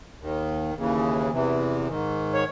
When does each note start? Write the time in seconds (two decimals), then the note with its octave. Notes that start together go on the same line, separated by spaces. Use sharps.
0.19 D#2 D#3
0.75 D#2 C#3 E3
1.31 E2 C3 E3
1.88 G#2 D#3
2.34 C#5